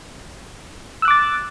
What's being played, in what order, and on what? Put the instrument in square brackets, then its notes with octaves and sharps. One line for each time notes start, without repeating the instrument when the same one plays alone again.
[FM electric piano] E6
F#6
D6
A6